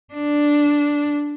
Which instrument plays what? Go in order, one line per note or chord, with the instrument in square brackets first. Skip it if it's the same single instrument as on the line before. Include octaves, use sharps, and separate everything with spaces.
[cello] D4